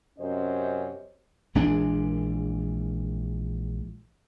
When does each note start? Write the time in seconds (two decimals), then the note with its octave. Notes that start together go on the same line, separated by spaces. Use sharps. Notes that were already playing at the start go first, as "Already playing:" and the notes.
0.19 F#2 C3 C#4 C5 D#5
1.55 A#1 E3 G#3 D4